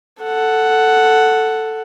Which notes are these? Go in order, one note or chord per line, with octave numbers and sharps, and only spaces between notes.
A4 F#5